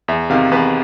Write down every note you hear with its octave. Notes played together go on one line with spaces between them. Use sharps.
E2 E5
C3 D#3 F5
E2 B4